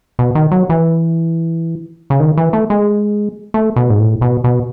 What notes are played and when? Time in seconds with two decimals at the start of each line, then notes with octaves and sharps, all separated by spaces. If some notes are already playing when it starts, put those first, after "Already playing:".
0.19 B2
0.35 D#3
0.52 F#3
0.69 E3
2.10 C#3
2.20 D#3
2.37 E3
2.53 A3
2.70 G#3
3.54 A3
3.76 B2
3.90 G#2
4.00 A2
4.21 B2
4.44 B2